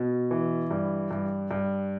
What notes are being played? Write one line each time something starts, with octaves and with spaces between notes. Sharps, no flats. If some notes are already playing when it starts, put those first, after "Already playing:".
Already playing: B2
E3
G2
G2
G2